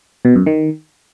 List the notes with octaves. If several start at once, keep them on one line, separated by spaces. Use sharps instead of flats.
B2
F#2
D#3